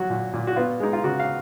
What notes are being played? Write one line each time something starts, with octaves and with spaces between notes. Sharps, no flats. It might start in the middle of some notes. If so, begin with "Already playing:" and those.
Already playing: F#3 F#4
A#2
A#2
F#4
B3 F4
G#3 D#4
F4
C#3 F#4
F5